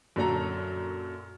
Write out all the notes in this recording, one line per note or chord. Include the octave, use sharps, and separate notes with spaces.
F#2 A#2 D3 F#3 A4 A#5